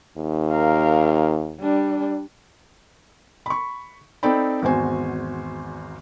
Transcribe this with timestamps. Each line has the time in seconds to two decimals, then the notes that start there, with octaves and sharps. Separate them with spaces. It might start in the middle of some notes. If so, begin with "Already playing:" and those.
0.17 D#2
0.51 A#4 F5
1.60 G3 D4
3.46 B5 C#6
4.23 C4 D#4 A4 D5 G5 B5
4.62 G#1 E2 F#4 C5 G#5